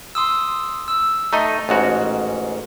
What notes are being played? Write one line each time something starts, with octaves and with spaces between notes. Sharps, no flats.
C6 D#6 E6
E6
A3 D#4 D#5 A#5
A1 G#2 F#4